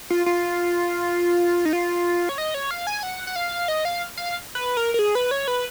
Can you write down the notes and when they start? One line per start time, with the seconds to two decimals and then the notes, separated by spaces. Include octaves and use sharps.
0.10 F4
0.26 F4
1.65 D#4
1.73 F4
2.29 C#5
2.38 D#5
2.54 C#5
2.71 F5
2.87 G#5
3.03 F#5
3.27 F#5
3.36 F5
3.68 D#5
3.85 F5
4.17 F5
4.55 B4
4.77 A#4
4.94 A#4
4.99 G#4
5.15 B4
5.31 C#5
5.48 B4